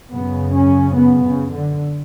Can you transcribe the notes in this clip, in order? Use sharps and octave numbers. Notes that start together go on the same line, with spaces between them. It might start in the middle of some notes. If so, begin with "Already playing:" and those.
F#2 C#3 B3
C#4
B3
C#3
D3